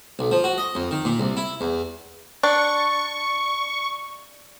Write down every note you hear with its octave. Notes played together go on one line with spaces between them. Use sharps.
B1
F3
F#4
D#5
F2
D#3
A#2
C2
E4
E2
D4 C#6